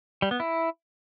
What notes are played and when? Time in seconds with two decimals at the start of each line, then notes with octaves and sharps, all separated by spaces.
0.22 G3
0.31 B3
0.40 E4